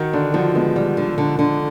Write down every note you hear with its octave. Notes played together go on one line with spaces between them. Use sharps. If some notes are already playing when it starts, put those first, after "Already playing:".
Already playing: D#3 F#4
D3 D4
F3 F#4
G#3 B3
G3
D3
D3
D3